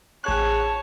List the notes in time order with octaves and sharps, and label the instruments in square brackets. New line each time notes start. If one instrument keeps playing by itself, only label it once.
[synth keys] A1 G#4 F#6 [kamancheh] C#5 A5